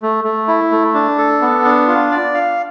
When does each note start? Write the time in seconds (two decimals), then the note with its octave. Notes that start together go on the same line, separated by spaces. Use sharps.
0.02 A3
0.24 A3
0.48 E4
0.72 A3
0.94 D4
1.18 A4
1.42 B3
1.65 D4
1.88 F4
2.11 D5
2.34 F5